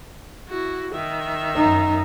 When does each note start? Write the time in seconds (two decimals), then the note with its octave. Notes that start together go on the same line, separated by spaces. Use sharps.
0.49 E4 F#4
0.92 D#3 E5
1.56 F#2 D#4